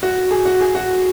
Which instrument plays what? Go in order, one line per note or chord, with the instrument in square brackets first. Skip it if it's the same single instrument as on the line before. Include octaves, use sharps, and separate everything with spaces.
[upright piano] F#4
G#4
F#4
G#4
F#4